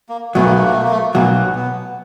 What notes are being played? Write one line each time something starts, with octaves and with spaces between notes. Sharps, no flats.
A#3
B1 B2 F#3 A3
A#3
A3
A#3
A3
A#3
A3
B1 B2 F#3 A#3
B3